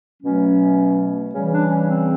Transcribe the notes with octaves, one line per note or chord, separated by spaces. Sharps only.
B2 F#3 A3 C#4
C#3 E3 G3 C#4
D4
C#4
C4